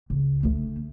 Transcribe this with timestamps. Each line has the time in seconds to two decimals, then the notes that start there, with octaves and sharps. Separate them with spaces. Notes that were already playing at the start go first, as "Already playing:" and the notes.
0.10 C#2
0.43 D2 A3